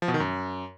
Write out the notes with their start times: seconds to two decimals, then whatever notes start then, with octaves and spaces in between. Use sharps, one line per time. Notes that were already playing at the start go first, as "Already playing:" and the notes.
0.02 F3
0.08 B2
0.14 D#3
0.20 F#2